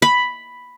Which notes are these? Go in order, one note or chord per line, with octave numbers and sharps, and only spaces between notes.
B5